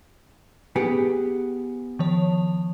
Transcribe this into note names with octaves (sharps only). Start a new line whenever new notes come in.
B3 G4 G#4
D#3 F3 C#5